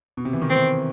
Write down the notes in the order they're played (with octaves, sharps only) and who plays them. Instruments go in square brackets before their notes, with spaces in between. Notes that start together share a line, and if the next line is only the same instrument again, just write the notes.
[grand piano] B2
C3
E3
D#3
[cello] C4